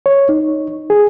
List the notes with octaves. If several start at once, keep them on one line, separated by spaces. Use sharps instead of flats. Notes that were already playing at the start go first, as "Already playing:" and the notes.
C#5
D#4
G#4